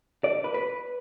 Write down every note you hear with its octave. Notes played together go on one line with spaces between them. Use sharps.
D5
B4
B4